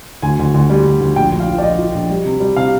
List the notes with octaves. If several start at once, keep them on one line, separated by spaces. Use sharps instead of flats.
D2 G#5
D2
D2
G3
D2
D2
A#1 G5
A#1
F5
F3
D5
A#1 D#5
F3
A#1
G3
C3
G3
C3 F5